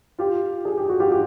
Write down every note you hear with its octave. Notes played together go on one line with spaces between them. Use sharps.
F4 G4
G#4
G4
F#4
F4 G4
G4